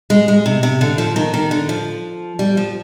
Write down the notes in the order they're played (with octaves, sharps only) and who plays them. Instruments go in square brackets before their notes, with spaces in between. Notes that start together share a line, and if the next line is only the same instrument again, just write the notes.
[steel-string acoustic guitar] G#3
G#3
C3
C3
D3
F3
D#3
D#3
D3
F3
G3
F3